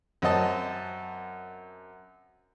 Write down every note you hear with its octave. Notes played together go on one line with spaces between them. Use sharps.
F#2 C4 D#5 A5